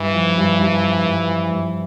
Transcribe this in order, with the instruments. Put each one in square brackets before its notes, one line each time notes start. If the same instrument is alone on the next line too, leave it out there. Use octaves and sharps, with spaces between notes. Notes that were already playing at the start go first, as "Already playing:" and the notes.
Already playing: [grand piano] G2 [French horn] E3
[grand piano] F3
G2
G2
F3
G2
F3
G2